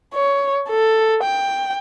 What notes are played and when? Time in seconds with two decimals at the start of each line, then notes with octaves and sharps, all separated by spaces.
0.14 C#5
0.69 A4
1.23 G5